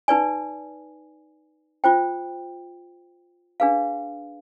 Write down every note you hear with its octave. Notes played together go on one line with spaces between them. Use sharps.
D#4 B4 D5 G#5
F4 C5 G5
D4 G#4 B4 F5